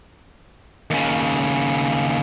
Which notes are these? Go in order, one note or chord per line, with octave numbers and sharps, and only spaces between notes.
D#2 C#3